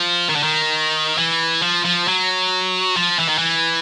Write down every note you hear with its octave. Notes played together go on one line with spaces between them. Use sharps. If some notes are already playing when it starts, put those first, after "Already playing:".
Already playing: F3
D#3
D3
D#3
E3
F3
F3
F#3
F3
E3
D#3
E3